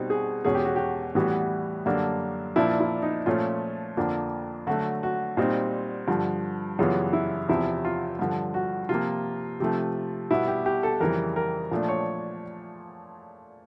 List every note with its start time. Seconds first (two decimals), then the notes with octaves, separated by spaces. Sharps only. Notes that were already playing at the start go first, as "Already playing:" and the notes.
Already playing: B2 G3 C4 D#4
0.10 G#4
0.45 E2 B2 G#3 C#4 G#4
0.55 G4
0.65 F#4
0.76 G4
1.15 A2 E3 G3 B3 F#4
1.86 F#2 D3 G3 A#3 D4
2.56 A#2 F3 A#3 D4 E4
2.80 E4
3.03 D#4
3.26 A#2 F3 A3 C#4 F4
3.97 F2 D3 F3 A#3 D4
4.67 D3 F#3 A3 F#4
5.03 F#4
5.37 A#2 G3 C4 D#4
6.08 G2 D3 F3
6.79 F#2 C#3 E3 G3 B3 F4
7.13 E4
7.49 E2 C3 F3 E4
7.85 F4
8.19 G2 D3 F3
8.54 F#4
8.89 C3 F3 A#3 F4
9.60 C3 F3 A3
10.30 B2 G3 B3 E4
10.48 G4
10.66 G4
10.83 A4
11.01 F2 C#3 E3 G3 A#4
11.36 A#4
11.71 A#2 F3 A3 D4
11.89 C#5